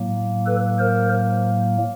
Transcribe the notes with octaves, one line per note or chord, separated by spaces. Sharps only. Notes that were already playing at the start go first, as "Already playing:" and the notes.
Already playing: A2 F#3 A#3
A4 B4
A#4 C5